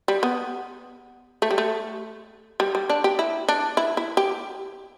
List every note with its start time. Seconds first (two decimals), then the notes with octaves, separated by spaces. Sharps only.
0.08 G3
0.23 B3
1.42 A3
1.51 G3
1.58 A3
2.60 G3
2.75 G3
2.90 D4
3.04 G4
3.19 E4
3.49 D4
3.77 E4
3.97 E4
4.17 G4